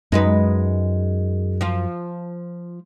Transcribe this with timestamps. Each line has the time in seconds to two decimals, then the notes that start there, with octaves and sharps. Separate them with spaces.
0.12 F#2 G#3 D#4 B4
1.61 F3 F4